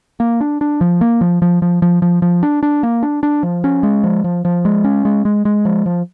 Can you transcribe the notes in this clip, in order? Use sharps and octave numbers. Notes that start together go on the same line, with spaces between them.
A#3
D4
D4
F3
A#3
F3
F3
F3
F3
F3
F3
D4
D4
A#3
D4
D4
F3
C#4
G#3
F3
F3
F3
G#3
C#4
G#3
G#3
G#3
F3
F3